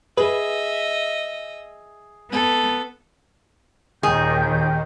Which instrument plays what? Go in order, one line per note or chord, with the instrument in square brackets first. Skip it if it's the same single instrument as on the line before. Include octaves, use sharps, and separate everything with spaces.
[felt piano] G#4 [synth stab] B4 [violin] D#5 E5
[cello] B3 [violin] A4
[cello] D#2 A#2 [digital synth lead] D#3 [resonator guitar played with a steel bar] G#4 [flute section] G5 G6